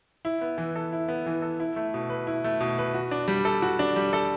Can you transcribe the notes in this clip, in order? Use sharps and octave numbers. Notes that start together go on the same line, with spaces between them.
E4
B3
E3
A4
E4
B3
E3
A4
E4
A3
B2
B4
E4
A3
B2
B4
F#4
D4
G3
A4
F#4
D4
G3
A4